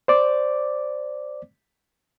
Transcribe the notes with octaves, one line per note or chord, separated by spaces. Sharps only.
C5 D5 D6